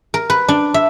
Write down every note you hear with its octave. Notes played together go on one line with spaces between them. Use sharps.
A#4
B4
D4
E5